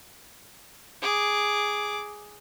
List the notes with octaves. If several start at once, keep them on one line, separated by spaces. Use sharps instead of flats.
G#4 D6